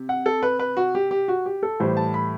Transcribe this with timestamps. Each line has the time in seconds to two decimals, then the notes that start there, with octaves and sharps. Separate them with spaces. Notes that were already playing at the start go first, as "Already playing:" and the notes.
Already playing: C3
0.09 F#5
0.26 A4
0.43 B4
0.59 B4
0.77 F#4
0.95 G4
1.11 G4
1.28 F#4
1.46 G4
1.63 A4
1.80 A2 E3 G3 C5
1.97 A5
2.14 B5